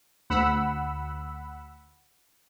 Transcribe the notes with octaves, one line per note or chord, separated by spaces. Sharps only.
D2 F#5 B5 E6